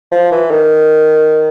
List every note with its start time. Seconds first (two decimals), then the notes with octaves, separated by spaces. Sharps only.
0.12 F3
0.32 E3
0.51 D#3